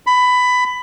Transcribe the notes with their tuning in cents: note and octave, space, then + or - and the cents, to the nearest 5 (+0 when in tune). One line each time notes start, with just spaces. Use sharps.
B5 +15